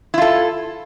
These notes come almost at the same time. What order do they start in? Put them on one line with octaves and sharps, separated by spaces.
E4 F4 A4